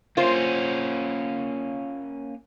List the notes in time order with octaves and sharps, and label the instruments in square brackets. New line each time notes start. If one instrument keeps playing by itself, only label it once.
[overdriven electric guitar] A#3 C#4 [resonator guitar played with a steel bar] F4 C5